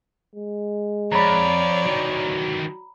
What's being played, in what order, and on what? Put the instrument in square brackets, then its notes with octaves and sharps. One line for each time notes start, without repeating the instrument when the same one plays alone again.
[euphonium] G#3
[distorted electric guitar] F2 [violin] C#5 D5 [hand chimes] A#5 B5
[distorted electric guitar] D#3 E3 [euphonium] F#4